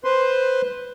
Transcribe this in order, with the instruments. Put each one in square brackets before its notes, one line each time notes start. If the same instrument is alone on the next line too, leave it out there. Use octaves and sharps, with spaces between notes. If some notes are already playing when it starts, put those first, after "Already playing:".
[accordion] B4 C5 C6